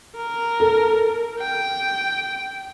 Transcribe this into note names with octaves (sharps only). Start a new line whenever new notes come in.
A#4
A4
G5